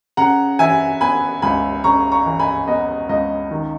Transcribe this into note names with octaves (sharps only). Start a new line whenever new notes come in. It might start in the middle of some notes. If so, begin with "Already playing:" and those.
C#3 F#5 A#5
E3 E5 G#5
B3 G#5 B5
C#2 G#5 B5
C#3 A#5 C#6
A#5 C#6
E3
G#5 B5
B3 D#5
C#2 D#5
D#3